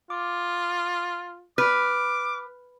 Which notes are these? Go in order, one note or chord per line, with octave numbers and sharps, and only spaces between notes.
F4 D6
B4 D6 F6 F#6